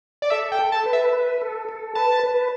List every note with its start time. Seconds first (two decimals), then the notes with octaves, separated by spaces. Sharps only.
0.22 D5
0.30 A4 E5
0.52 G5
0.59 A4
0.72 A5
0.85 B4
0.93 E5
1.13 B4
1.41 A4
1.69 A4
1.95 B4 A5
2.23 B4